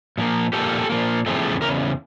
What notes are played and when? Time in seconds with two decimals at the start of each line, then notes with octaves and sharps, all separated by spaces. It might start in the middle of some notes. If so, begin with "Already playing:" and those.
0.18 A#2 F3 A#3
0.53 A#2 F3 A#3 G4 A4
0.90 A#2 F3 A#3
1.26 E2 C#3 F3 A3 C4
1.61 E2 C#3 A#4